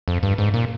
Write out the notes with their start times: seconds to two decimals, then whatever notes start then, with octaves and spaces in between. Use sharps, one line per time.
0.08 F2
0.23 G2
0.38 G#2
0.54 A#2